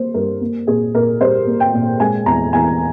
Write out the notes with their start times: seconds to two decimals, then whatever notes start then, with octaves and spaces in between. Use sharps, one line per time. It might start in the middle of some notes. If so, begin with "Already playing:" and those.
Already playing: A#3 C5
0.14 G2 A#4
0.41 A#3
0.67 A#2 G#4
0.94 A#2 A#4
1.20 G3 C5
1.47 A#3
1.60 G5
1.74 A#2
2.00 G#3 G#5
2.26 E2 A#5
2.53 E2 G#5